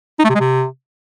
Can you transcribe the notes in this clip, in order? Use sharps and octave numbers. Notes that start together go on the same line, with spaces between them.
D#4
A3
C3
G#3
C3